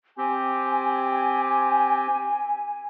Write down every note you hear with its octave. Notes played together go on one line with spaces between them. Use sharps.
C4 G4 G#5